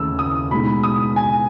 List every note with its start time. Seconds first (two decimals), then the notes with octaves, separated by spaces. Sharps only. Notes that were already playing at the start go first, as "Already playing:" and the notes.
Already playing: D#2 C#3 A3 E6
0.19 D#6
0.51 B2 G#3 D#4 B5
0.83 D#6
1.16 G#5